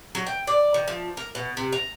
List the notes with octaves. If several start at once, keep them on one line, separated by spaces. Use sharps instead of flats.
F#3
G5
D5
D#3
F3
A#4
B2
C3
A#5